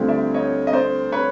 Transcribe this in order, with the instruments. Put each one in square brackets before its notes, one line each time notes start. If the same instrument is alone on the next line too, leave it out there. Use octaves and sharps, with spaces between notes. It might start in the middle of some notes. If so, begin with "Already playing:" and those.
Already playing: [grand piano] D2 D3 G3 C4 F4
[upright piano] D5 E5
C#5 D#5
D#5
C5 D5
B4 C#5